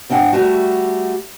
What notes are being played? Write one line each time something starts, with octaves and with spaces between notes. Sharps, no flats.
G#2 C4 D4 F#5
G3 A3 F#4